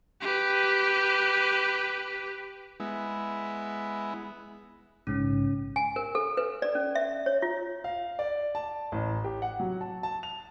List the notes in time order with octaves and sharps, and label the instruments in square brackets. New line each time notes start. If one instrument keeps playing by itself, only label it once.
[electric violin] G4 B4
[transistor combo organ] G#3 B3 E4
[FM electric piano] A#1 G#2 C#3 [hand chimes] C#4
[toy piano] G#5
A#4
A4
B4
D5
C#4
E5
C#5
F4
[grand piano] F5
D5
A5
A1
G4
F#5
F#3
A5
A5
F7